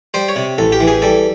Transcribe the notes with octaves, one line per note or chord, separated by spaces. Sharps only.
G3 C5
C#5
C3
A1 A4
G4
E3
G#4
G3 A4